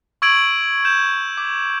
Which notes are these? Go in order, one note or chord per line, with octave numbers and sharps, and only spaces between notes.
C#6 E6 G#6 D7 D#7 F#7
G6 E7
D6